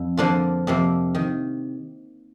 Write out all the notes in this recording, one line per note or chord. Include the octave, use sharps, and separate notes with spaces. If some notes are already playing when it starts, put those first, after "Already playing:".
Already playing: F2
D3 F3 A#3 D4 F4
F2 C3 F3 A#3
D#3